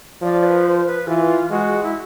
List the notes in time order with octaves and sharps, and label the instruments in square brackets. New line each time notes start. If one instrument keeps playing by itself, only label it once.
[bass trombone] F3 [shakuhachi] D5
[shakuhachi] B4
C5
B4
[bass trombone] E3 [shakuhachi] F4
[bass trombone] G#3 [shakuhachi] F#4
[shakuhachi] E4